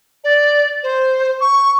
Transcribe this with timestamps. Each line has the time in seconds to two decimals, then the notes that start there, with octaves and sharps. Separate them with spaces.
0.24 D5
0.83 C5
1.40 C#6